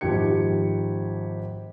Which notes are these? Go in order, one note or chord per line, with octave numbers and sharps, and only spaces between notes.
G#1 F3 G4 G#6 C#7